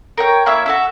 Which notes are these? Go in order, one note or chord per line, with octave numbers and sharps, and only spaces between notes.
A#4 C#5 G5
A#3 E4 C#5 E5
F#4 A4 E5